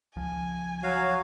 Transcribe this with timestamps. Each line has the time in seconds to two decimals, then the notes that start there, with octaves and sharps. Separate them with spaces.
0.16 C#2 F3 G#5
0.83 F#3 F#4 C#5 F5